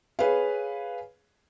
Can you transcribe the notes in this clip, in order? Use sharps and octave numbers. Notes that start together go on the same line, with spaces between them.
G#4 B4 C#5 F5